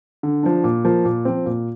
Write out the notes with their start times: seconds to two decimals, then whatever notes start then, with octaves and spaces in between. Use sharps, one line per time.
0.23 D3
0.43 F3 D4
0.64 A#2
0.85 F3 A#3
1.05 A#2
1.25 F3 C4
1.46 A#2